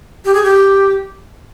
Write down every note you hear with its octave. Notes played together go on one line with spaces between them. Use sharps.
G4
G#4
G4